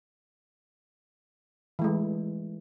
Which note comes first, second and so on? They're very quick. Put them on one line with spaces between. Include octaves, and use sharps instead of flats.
E3 A3 G#3